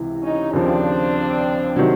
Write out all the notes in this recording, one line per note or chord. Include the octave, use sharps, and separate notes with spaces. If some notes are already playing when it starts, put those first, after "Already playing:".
Already playing: C#2 C3 E3
C#4 D#4
D#2 C#3 F3 C4 D4
C3 D#3 F#3